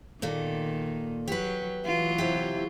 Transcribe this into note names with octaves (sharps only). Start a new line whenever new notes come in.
A#2 D#3 A#3 A4
F#3 G4 B4
E3 F#3 F4
C3 E4 G4